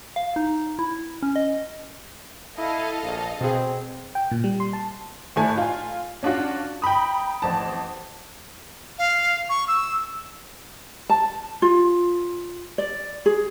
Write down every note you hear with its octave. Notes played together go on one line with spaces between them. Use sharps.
F5
D#4
E4
C#4
D#5
E4 A4 D#5 F5
A#1
B2 C4 G#4
G5
A#2
G3
C6
A5
G#1 A2 A3 G#5 A5
F4 G#5
C#4 D4 F4 F#4
G5 A#5 B5 D#6
A1 F2 A5
F5
C#6
E6
A5
F4
D5
G#4